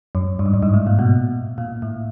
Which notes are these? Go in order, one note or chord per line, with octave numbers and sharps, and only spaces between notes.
F#2
G2
G#2
G2
G#2
A2
A#2
B2
A#2
A2